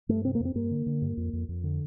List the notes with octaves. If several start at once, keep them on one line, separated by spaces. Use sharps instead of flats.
G2 A3
C3 C4
A#3
F2
C4
G2 A#3
D3
D3
G2
F2
F2
F2
D3